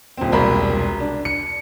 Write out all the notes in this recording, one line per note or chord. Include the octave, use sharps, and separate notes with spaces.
D#1 C4
E1 C2 A#4 B5 C6
D4
C#7